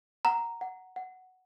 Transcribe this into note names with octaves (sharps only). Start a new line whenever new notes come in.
F#5 A#5
F#5
F#5